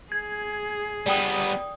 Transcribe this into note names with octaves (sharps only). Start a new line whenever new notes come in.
G#4 G#6
G3 B3 D5 G5 D#6